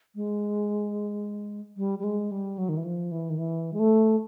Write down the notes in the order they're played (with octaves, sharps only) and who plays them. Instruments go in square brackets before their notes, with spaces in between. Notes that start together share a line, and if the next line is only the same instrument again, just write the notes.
[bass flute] G#3
G3
G3
G#3
G3
F#3
D#3
E3
F3
E3
D#3
E3
G#3
A3